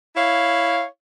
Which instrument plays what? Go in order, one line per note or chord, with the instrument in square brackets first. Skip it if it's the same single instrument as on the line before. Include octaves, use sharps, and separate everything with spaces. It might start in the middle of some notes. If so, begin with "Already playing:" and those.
[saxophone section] E4 C#5 F5